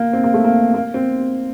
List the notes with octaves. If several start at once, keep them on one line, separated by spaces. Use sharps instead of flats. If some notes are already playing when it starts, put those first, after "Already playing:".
Already playing: A#3
C4
A#3
A3
A#3
A#3
C4